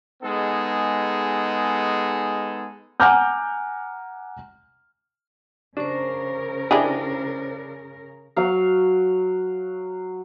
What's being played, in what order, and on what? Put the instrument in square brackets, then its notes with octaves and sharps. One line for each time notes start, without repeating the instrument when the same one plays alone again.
[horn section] G#3 B3 D#4 G#4 A4
[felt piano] F#5 G#5 A#5 D6 F6 G6
[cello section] C#3 A#4 [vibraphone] C#4 C5 [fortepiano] D4
[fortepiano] D4 [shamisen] E4 G4 G#4
[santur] F#3 F5